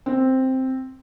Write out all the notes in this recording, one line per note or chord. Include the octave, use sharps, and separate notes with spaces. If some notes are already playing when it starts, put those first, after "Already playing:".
C4